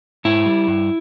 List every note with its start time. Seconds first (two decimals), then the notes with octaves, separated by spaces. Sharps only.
0.25 G#2 E4
0.46 G3
0.67 G2